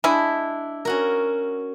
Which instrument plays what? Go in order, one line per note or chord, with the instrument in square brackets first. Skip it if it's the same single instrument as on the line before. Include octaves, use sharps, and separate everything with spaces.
[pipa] G#3 E4 [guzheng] D4
[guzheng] C#4 F#4 A#4